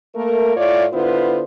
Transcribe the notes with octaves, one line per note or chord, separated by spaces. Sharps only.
A3 A#3 A#4
A2 E4 F4 C#5 D5
D3 B3 E4 F4 B4 C5